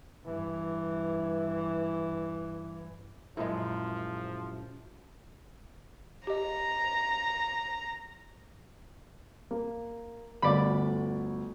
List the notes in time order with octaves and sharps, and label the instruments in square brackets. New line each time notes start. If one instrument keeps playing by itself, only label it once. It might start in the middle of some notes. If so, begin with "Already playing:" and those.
[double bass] G2 E3
[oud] F#2 G#3 [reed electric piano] A#2 E4 [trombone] F3
[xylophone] G4 D#5 [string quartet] A#5
[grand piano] A#3
[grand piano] G1 D2 [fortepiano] D5 B5